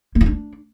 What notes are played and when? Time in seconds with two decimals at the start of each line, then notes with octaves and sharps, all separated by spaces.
0.15 A#3
0.21 E4
0.26 D4